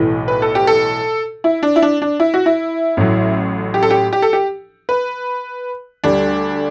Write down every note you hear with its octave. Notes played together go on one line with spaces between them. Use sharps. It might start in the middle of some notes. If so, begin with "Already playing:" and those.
Already playing: B1 A2 E3
B4
A4
G4
A4
E4
D4
E4
D4
D4
E4
F#4
E4
A1 A2 F#3
G4
A4
G4
G4
A4
G4
B4
D2 D3 G3 D4